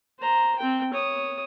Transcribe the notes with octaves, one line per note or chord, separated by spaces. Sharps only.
C5 A#5
C4 G5
C#5 D#6